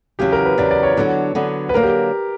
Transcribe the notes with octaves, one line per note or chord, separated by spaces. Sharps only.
E2 C#3 F#3 G4
A#4
B4
E2 C#3 F#3 D5
D5
C#5
D3 F#3 B3 D4
D3 F#3 B3 D4
B4
D3 F#3 A#3 A#4
G4